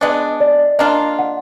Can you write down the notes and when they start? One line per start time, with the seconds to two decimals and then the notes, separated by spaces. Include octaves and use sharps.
0.01 G#3 B3 D4 D#5
0.40 D5
0.79 A#3 D4 F4 D#5
1.19 F#5